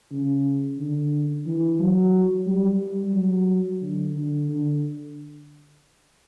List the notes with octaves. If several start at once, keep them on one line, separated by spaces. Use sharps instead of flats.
C#3
D3
E3
F#3
G3
F#3
D3
D3
D3